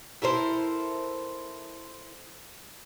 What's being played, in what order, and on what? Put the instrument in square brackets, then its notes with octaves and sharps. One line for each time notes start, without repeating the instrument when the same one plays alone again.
[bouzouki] E4 A4 A#4 C5